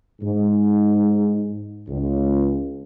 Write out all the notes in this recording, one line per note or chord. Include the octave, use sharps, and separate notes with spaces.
G#2
C#2